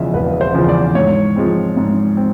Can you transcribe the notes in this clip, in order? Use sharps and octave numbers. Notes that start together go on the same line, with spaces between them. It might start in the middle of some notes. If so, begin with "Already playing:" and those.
Already playing: E1 E2 C#3 F3 D#5 E5
E1 B4
C5
E2 C#3 F3
D5
G#2 C#5
F3 G#3 C4
G#2
C4